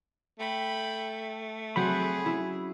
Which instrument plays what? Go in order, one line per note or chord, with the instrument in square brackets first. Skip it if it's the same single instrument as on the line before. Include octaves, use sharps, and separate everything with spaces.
[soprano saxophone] A3 [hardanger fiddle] G5 B5
[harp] F#3 C4 F#4 [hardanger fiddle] G#4 [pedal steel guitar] B5
[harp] C#4 E4